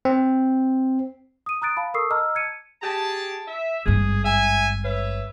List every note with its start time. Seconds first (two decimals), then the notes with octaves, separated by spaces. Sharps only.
0.05 C4
1.46 D#6 D#7
1.62 A#5 D#6 F#6 A6 D7
1.77 F5 A5 B5
1.94 A4 A#4 C#6 D#6 E6 C7
2.10 D#5 A5 A#5 D6 E6 F6
2.35 G#6 C#7 D#7
2.83 G4 G#4 A5
3.47 E5
3.86 G#1 G2 G#4
4.25 E5 G#5
4.84 B4 C#5 E5